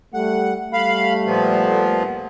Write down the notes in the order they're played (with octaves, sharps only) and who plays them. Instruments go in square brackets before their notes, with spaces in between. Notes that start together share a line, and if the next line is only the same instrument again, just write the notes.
[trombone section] G3 A3 [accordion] F#5
[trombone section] G3 A3 [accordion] F5 B5
[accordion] A#2 F3 B3